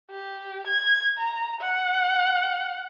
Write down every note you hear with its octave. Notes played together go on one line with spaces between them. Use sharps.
G4
G#6
A#5
F#5